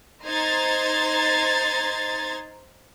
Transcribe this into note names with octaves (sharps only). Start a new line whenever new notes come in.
D#4 C5 A#5 C6 G#6 A6